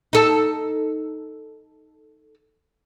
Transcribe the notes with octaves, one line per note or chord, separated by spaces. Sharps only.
D#4 A4